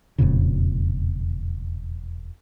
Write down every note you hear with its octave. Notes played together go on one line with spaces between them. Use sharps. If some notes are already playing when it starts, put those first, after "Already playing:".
E1 F2 A#2 C#3